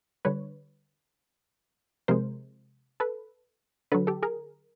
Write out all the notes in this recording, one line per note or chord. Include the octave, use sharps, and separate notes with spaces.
D3 G3 B4 C#5
C3 F3 G#3 A#4 C5
A4 B4
D3 F#3 A4 B4
G4 A4
G#4 A#4